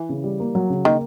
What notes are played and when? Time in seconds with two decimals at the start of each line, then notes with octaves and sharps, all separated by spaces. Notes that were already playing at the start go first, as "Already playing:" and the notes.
Already playing: E3
0.09 C#3
0.24 G3
0.40 A#3
0.55 F#3
0.70 C#3
0.85 D#3 A#3